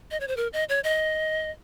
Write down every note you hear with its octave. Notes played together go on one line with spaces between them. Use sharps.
D#5
C#5
C5
A#4
D#5
C#5
D#5